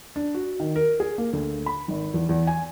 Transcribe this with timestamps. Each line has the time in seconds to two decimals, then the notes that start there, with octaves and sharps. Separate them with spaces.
0.16 D4
0.35 F#4
0.60 D#3
0.76 A#4
1.00 G#4
1.18 A#3
1.33 D2
1.66 B5
1.88 G#1
2.14 E2
2.29 E2
2.47 G#5